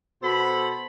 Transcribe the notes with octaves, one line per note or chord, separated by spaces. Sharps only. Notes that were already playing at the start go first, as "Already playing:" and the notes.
B2 F#4 A4 C5 B5